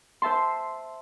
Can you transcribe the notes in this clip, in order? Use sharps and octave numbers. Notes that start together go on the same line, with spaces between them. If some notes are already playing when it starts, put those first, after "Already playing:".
C5 E5 A5 C6